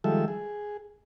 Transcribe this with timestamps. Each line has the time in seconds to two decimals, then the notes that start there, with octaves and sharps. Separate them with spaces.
0.04 D#3 F3 G3 G#3 A4 E5
0.28 G#4